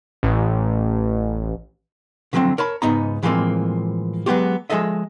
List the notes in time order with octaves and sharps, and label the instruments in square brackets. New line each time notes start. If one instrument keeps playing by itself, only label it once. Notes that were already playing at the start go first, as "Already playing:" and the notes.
[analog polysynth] A1
[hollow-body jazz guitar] D3 F3 F#3 A3 C4
A#4 C#5 A5 B5
C#2 G#2 B3 D#4 A#5
A2 E3 F3 G#3 A#3 C4
F#3 G#3 B3 C#4 F#4 G4
F3 G#3 G#4 A4 D#5 E5